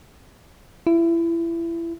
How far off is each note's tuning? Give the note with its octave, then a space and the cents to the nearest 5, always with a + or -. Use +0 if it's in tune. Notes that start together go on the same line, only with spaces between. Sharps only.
E4 +25